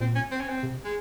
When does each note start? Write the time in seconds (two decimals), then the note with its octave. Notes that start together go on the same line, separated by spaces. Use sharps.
0.01 A#2 C4
0.16 C#4
0.31 C4
0.40 C#4
0.49 C4
0.63 C3
0.85 G#3